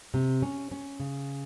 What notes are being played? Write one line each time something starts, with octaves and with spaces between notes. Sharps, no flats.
C3
C#4
C#4
C#3